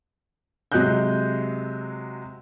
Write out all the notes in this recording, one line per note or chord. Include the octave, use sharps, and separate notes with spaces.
C3 F#3 G#3 D#5 F#6 G6